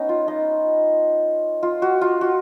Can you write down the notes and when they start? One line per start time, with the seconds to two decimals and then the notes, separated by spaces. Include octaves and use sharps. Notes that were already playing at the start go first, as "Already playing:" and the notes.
Already playing: B3 C#4 D#4
0.09 F4
0.28 D#4
1.63 F4
1.82 F#4
2.01 F4
2.21 F#4